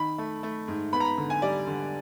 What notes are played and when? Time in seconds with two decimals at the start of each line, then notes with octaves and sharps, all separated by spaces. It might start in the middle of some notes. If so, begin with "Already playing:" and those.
Already playing: D#3 B5
0.18 A3
0.43 A3
0.68 G#2
0.93 B3 B5
1.00 A#5
1.05 B5
1.18 D3
1.30 G#5
1.42 G3 D5
1.67 D3